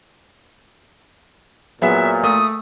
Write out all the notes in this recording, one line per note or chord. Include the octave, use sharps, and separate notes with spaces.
A#2 F#3 B3 G#4 E5
A3 D#6